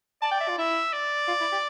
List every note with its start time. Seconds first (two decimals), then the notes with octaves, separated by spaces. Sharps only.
0.22 D5 A5
0.31 G5
0.40 E5
0.48 F4
0.58 E4 E5
0.93 D5
1.28 F4
1.40 E4
1.52 G4